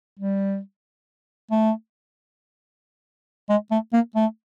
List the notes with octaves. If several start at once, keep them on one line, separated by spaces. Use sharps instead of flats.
G3
A3
G#3
A3
A#3
A3